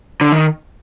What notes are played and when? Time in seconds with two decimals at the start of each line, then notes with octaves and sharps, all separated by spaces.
0.21 D3
0.32 D#3